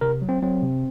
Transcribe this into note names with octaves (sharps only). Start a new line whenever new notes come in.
C3 A#4
F#3
C4
F#3 C4
C3